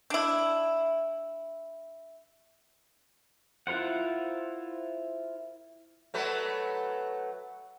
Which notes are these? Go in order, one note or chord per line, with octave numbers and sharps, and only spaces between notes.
D4 E4
E4 F4 A#4 C5 F#5
F#3 A3 B4